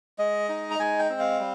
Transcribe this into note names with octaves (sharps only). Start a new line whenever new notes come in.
G#3 D#5
D#4
A#5
G#3 G#5
G5
C4
F5
G3